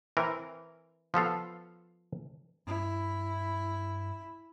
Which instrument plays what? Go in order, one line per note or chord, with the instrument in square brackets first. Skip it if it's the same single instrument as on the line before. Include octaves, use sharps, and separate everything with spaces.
[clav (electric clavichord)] E3 C4 A#4
F3 B3 A4 F5
[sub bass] G2 [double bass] E4